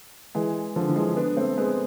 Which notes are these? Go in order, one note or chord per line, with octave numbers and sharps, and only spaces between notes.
E3 G#3
D3 F3
F3
E3 G#3
B3 D4
A3 C4
G#3 B3